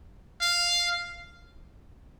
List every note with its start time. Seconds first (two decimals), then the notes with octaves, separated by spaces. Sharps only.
0.41 F5